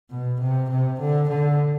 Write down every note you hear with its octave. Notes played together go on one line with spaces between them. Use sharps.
B2
C3
C3
D3
D3